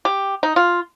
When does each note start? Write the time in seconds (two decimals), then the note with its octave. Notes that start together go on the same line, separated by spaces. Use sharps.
0.05 G4
0.43 D#4
0.56 F4